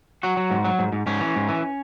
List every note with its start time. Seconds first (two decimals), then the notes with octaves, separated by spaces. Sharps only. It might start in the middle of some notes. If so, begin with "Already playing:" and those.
0.23 F#3 F#4
0.37 F#3
0.51 G#2
0.65 F#3
0.79 G#2
0.92 G#2
1.06 G#2 C#4
1.20 E3
1.36 G#2
1.49 E3